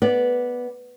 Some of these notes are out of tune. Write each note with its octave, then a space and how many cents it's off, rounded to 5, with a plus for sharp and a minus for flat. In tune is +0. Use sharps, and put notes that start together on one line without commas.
B3 -5 D5 +5